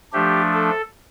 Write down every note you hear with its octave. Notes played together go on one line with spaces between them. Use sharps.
F3 A3 D4 G4
A4